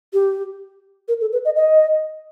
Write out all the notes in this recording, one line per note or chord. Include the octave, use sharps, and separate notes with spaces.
G4
A#4
A4
B4
D#5
D#5